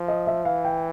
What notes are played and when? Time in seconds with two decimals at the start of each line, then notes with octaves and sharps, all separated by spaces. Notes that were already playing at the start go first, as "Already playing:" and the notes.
Already playing: F3
0.08 D#5
0.27 E5
0.45 E3 F5
0.64 G5